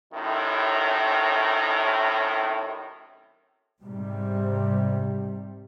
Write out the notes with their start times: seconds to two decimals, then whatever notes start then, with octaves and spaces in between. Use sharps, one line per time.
0.13 F#2 A2 C3 D#3
3.82 G#2 C3 G3